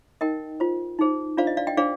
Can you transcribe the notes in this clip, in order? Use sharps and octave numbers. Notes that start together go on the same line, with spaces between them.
D#4 A#4 D#5 G5
F4 C5
D#4 G#4 C5
D4 F4 C5 D5 F5
D#5
D5 F5
D#5 G5
D4 G#4 C5 D5 F5